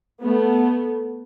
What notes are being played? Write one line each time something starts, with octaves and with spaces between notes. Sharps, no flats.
A3 B3